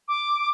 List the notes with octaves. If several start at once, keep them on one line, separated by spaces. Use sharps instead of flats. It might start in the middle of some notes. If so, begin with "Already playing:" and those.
D6